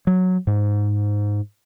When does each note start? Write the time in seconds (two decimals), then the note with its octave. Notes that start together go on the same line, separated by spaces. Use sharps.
0.07 F#3
0.47 G#2